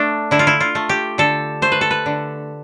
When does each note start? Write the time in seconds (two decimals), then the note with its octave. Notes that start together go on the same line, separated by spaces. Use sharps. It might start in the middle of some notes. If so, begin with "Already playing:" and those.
Already playing: A3 D4
0.31 D3 E4
0.39 F4
0.47 E4
0.60 F4
0.75 A3
0.89 G4
1.18 D3 A4
1.62 A3 C5
1.72 B4
1.81 A4
1.91 B4
2.06 D3